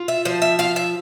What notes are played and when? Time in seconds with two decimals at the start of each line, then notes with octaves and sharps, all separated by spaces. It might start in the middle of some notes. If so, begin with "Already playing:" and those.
Already playing: F4
0.08 E5
0.25 F3 C5
0.42 E5
0.59 F4 F5
0.76 E5